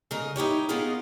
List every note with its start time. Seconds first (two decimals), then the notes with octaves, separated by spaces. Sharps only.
0.11 C#3 A#4 D#5
0.36 D#4 E4 G4 C#5
0.69 B3 C#4 D#4 F4 G#4 A#4